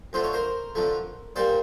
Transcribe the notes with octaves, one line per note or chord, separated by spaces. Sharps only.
F2 D3 F3 A3 C5
C#5
A#4 C5
F2 D3 F3 A3
A#2 G3 A#3 C5 D5